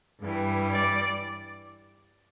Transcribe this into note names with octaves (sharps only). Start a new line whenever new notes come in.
G2 E3 G3
D5